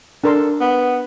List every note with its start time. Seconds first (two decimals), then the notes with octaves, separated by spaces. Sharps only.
0.24 D4 A4 A#4 C6
0.61 B3